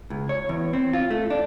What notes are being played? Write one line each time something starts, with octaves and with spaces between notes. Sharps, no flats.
C#2
C#5
E2
C4
F4
A3
D4